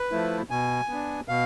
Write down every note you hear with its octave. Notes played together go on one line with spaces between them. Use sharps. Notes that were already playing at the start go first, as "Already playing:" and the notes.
Already playing: B4
F3 A3 E4
B2 G#5
B3 D4
B2 F5